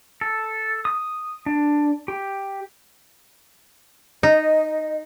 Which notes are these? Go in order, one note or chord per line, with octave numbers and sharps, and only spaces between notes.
A4
D#6
D4
G4
D#4 D#5